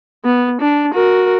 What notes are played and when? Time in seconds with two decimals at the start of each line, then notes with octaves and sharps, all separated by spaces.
0.25 B3
0.61 D4
0.94 F#4 A#4